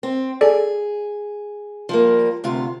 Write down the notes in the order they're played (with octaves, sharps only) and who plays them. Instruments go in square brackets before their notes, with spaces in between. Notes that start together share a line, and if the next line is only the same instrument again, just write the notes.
[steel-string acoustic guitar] C4
[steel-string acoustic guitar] G#4 [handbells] A4 D5
[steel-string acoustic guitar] F3 G3 A#3
D2 C3 F4